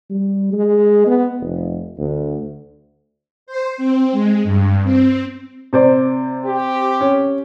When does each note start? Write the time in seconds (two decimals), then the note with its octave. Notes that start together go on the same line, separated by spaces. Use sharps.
0.10 G3
0.53 G#3
1.07 B3
1.40 F1
1.98 D2
3.47 C5
3.77 C4
4.12 G#3
4.44 G2
4.84 C4
5.73 C3 C5 D5
6.44 C4 G4
7.01 C#4